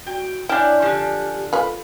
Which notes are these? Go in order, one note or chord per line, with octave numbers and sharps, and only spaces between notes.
F#4 G5
D4 E4 C#5 G5 G#5 F6 G6
D3 F3 G4
F4 A4 B4